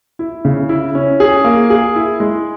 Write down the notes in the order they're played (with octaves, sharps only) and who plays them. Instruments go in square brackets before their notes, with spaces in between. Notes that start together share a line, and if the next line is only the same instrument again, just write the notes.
[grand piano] E4
C#3
E4
C#4
G#4
A#3
G#4
E4
G#3